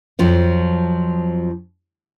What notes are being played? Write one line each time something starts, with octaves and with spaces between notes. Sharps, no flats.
F2 F3 F#3